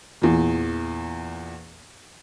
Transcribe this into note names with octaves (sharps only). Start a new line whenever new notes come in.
E2 A#2